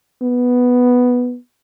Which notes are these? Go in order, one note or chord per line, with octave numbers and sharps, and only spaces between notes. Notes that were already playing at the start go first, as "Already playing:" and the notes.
B3